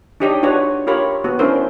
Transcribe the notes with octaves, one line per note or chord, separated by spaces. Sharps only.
D4 D#4 G4 C#5 D#5
D4 F4 F#4 B4 C#5
F4 G4 A#4 C#5 B5
B3 F#4
C#4 D4 E4 A#4 C5